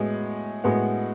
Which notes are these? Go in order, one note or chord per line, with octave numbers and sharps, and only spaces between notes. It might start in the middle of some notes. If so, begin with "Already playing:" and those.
Already playing: A2 G#3 B3 F#4
A2 G#3 B3 F#4